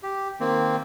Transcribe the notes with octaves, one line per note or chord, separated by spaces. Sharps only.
G4
D#3 A#3 C4